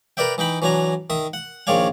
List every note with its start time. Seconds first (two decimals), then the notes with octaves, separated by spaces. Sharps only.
0.17 A#4 B4 D5 E5 G5
0.38 E3 D#4 G5 B5
0.62 E3 F#3 D4 G#5 A#5
1.10 D#3 E5 D#6
1.33 F#5
1.67 A#1 D#3 C#5 D5 F5 G#5